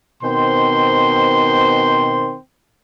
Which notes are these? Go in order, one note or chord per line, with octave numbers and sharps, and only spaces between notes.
B2 D#3 C4 C5 G5 C6